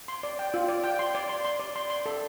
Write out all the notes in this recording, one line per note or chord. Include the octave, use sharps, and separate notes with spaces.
C6
D5
G5
F4
D5
G5
C6
D5
C6
C6
D5
C6
C6
A4